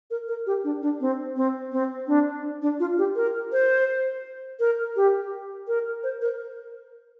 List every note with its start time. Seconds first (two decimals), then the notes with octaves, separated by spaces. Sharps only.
0.11 A#4
0.28 A#4
0.47 G4
0.64 D4
0.82 D4
1.00 C4
1.37 C4
1.72 C4
2.08 D4
2.62 D4
2.80 F4
2.98 G4
3.16 A#4
3.52 C5
4.60 A#4
4.96 G4
5.68 A#4
6.03 C5
6.21 A#4